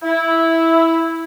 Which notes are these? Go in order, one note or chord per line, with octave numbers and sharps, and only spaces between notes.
E4